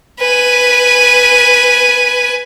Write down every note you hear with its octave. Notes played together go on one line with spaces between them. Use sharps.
B4 G#5